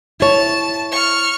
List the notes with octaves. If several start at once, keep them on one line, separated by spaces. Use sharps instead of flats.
E4 C#5 A5
C#6 F6